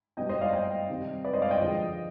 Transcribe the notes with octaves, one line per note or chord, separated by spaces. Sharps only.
B2 G3 B3 D#5 G5
C5 D#5
D5 F5
D#5 G5
C3 D#3 G3 C4
B4 D5
C5 D#5
D5 F5
D#5 G5
F2 D3 F3 G#3